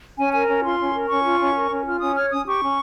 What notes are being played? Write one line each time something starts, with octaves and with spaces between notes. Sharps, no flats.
C#4 G#5
A#4 G#5
C#4
F4 C6
C#4
A#4
C#4 C#6
F4
C#4
A#4
C#4
F4 F6
C#4 D#6
C#5 F6
C#4 D#6
G4 C#6
C#4